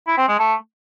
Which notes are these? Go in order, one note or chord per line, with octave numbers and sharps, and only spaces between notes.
E4
C4
G#3
A3